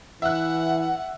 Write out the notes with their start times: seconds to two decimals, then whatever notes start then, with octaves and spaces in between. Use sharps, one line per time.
0.22 E3 E5 F#5 F#6